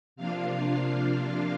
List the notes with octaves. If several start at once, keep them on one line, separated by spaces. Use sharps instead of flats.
C3 F3 A#3 D4 F4 F5
F5